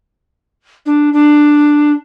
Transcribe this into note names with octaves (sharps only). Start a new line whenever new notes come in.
D4
D4